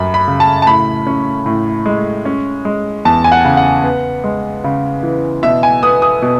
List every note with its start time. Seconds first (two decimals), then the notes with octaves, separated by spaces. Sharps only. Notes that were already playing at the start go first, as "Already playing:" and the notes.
Already playing: F#2 B5
0.14 B5
0.28 C#3
0.40 A5
0.62 A5
0.67 A2 B5
1.07 C#4
1.46 A2
1.86 G#3
2.25 C#4
2.65 G#3
3.05 E2 A5
3.24 G#5
3.32 F#5
3.45 C#3
3.57 F#5
3.84 B3
4.24 G#3
4.64 C#3
5.03 E3
5.43 B2 E5
5.63 G#5
5.83 B3 D#6
6.02 D#6
6.22 B2